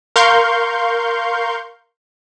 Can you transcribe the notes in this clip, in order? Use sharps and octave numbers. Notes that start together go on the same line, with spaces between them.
A#4 F5 C6 C#6 G6